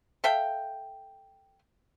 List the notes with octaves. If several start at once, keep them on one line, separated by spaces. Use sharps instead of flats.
A4 E5 F5 G5